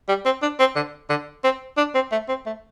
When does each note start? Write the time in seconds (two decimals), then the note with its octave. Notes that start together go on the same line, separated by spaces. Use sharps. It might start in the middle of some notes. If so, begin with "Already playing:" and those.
0.08 G3
0.25 C4
0.42 D4
0.59 C4
0.76 D3
1.10 D3
1.44 C4
1.77 D4
1.95 C4
2.12 A3
2.29 C4
2.46 A3